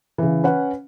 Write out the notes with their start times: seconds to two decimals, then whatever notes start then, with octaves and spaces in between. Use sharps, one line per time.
0.18 C#3 E3
0.44 C#4 B4 F#5